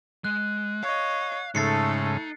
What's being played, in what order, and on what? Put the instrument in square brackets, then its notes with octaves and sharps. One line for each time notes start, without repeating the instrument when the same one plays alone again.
[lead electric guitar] G#3 [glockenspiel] F#6
[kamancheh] C#5 D#5 [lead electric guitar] F5
[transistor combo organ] G#2 C#3 [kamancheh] A3 A4 [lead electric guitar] D#4 [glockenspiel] A6 C7 C#7